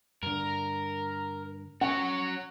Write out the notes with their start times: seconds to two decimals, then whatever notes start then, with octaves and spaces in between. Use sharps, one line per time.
0.23 G2 D3 A#4
1.81 C#4 F#4 C#5 F#5